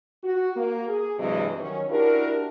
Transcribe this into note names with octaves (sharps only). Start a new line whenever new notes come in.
F#4
A#3
G#4
G2 C3 E3 F#3 G#3 D#5
D#3 F#3 C#4
D4 E4 F#4 G4 A#4